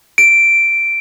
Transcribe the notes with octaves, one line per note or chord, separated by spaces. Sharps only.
D7